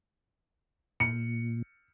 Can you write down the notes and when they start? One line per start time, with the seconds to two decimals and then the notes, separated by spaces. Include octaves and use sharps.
1.00 A#2 C#7